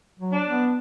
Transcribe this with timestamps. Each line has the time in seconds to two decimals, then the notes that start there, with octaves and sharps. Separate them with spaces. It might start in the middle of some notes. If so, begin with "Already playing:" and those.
0.19 F#3
0.33 D4
0.47 B3